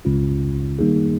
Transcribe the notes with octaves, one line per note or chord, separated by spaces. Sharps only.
C#2 C#3 G#3 C#4 F4
D#3 G3 A#3 D#4 G#4